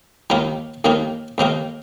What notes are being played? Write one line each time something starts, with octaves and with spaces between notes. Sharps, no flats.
D#2 D#3 A#3 D#4 A#4
D#2 D#3 A#3 D#4 A#4
D#2 D#3 A#3 D#4 A#4